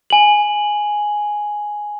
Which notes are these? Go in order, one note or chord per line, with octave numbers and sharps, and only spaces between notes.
G#5 F#7